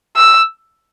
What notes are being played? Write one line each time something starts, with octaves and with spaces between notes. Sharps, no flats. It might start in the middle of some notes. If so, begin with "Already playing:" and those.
E6